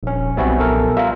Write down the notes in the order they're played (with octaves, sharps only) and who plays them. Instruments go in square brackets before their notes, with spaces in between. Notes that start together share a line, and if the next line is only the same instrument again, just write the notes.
[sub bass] D#1 [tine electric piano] A#1 C#4
[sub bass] B1 [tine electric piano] G3 C4 F#4 [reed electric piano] B3 E5 G#5
[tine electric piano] A#1 A4 A#4
[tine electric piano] G3 F4 [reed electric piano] E5 F5 A#5